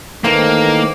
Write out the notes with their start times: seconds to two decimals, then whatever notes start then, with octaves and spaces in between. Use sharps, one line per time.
0.24 D#3 E3 A3 A#3 C4